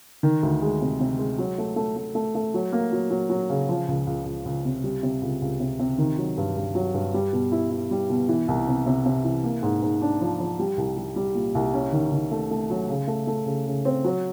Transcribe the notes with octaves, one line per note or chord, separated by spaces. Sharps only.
D#3
D2
G#3
C3
C3
G#3
F#3
A3
A3
A3
A3
A3
F#3
A#3
F#3
F#3
F#3
C#3
F3
C#2
C#2
C#2
C#2
C3
G3
C3
C#2
C#2
C3
C3
D#3
F#3
G2
G2
F#3
G2
G3
B2
E4
E4
G3
B2
E3
C2
C3
C3
C3
E3
A#3
G#2
G#2
D4
F3
F3
G3
C2
G3
G3
A#2
C2
C#4
D#3
D#3
A3
A3
F#3
C#3
A3
A3
C#3
C#3
C4
F#3